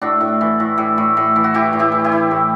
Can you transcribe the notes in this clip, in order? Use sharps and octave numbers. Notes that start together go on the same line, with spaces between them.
A2 D4 F#4
A2
E3
A2
A2
A2
A2
E3
F#4
E3 E4 G4
A2
E4 G4
E3
E4 G4
E3
A2